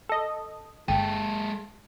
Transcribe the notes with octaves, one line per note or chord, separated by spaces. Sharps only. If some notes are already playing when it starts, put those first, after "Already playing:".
A4 D#5
G1 G#3 A4 G5